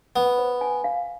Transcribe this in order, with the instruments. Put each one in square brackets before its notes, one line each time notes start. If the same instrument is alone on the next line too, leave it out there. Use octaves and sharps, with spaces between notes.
[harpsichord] B3 [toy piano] F#5
[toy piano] C5
G#5
F5